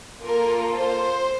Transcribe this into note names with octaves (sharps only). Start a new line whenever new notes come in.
A#3 F4 A4 A#4
C5